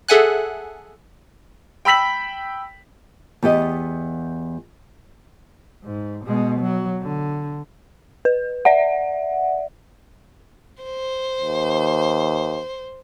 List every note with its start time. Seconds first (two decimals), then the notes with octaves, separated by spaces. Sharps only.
0.08 G#4 A4 E5 F#5 G#5 F#6
1.85 G5 B5 E6 B6 F#7
3.43 E2 B3 G4 D#5
5.84 G#2
6.26 B2 G#3
6.61 F#3
7.02 D3
8.25 B4
8.65 D5 E5 F#5
10.83 C5
11.41 D#2